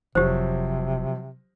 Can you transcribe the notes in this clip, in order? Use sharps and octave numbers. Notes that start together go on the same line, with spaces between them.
F1 C3 F3 F#3 G4 C5